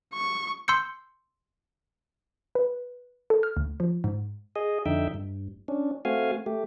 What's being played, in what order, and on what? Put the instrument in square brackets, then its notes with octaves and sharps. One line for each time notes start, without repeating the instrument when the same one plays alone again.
[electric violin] C#6
[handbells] C6 E6 G6 C#7
[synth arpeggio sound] B4
A4
F6
D2
F3
G#2
[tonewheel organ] G#4 D#5
F2 D3 D#4 E5 G5
G2
C#4 D4
A3 C4 F#4 F5 G#5
A3 G4